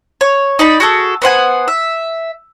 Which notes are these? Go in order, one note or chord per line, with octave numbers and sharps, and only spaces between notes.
C#5
D#4 D5 B5
F#4 G#4 A4
B3 C5 F#5 G#5
E5